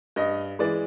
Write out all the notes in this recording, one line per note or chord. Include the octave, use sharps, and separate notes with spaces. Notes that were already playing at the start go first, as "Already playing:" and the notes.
G2 D#5
E3 G#3 D5